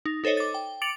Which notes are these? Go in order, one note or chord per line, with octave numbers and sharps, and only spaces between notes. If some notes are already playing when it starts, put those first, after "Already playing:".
D#4
D#4 A4 C5 C#5 D#5
D6 A6
G5
D6 A6 C#7 D7 F7 F#7